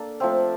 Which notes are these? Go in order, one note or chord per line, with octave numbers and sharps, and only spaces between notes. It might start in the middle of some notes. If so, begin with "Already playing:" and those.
Already playing: A#3 D4 A4
F3 A3 C4